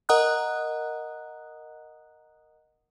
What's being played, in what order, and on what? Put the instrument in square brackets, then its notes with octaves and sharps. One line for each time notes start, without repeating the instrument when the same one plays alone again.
[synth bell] A#4 D#5 F#5 A#5 D#6 F#6